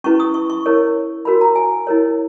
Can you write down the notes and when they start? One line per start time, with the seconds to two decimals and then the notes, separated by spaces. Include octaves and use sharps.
0.04 C#4 E4 B4 C#6
0.20 D#6
0.34 C#6
0.50 C#6
0.66 E4 A#4 C#5
1.25 F#4 A#4 C#5 B5
1.41 A#5
1.56 G#5
1.87 E4 A#4 C#5